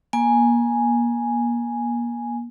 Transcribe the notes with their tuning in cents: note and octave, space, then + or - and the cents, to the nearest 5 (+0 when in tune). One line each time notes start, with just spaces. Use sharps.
A#3 +35 G#5 +0